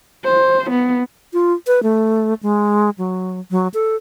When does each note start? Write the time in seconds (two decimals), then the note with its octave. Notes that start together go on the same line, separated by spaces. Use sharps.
0.25 C5
0.70 B3
1.33 F4
1.67 B4
1.83 A3
2.43 G#3
2.98 F#3
3.51 F#3
3.74 A4